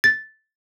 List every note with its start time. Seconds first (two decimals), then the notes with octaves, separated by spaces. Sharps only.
0.04 A6